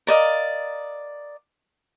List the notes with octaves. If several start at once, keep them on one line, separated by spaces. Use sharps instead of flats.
A#4 D5 D#5 F5